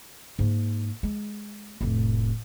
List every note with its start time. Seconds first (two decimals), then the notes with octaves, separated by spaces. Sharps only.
0.39 G#2 A#3
1.03 G#3
1.81 F1 A2